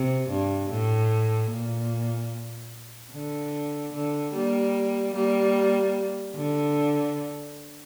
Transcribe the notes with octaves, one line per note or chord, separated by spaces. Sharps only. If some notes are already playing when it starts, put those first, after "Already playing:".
Already playing: C3
G2
A2
A#2
D3
D3
G3 A#3
G3 A#3
D3